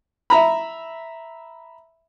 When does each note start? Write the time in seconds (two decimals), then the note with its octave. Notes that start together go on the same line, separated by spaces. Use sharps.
0.30 E5 A#5 B5